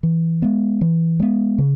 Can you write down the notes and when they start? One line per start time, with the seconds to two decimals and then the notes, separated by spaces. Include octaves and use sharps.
0.03 E3
0.42 G#3 B3
0.81 E3
1.20 G#3 B3
1.58 C#3